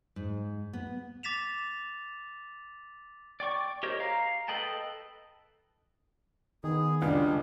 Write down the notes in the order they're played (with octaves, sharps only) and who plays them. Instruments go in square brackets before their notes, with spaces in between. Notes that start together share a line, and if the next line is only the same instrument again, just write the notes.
[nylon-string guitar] G#2
B3
[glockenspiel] D6 A6 B6 E7 F7
[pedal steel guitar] D5 G5 C#6 D6
G4 A#4 C5 C#5 D#5
F5 A#5
A4 B4 D#5 G5 A5
[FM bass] D#3 [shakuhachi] B3 [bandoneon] G#4
[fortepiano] C#2 [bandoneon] G3 G#3 [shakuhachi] D4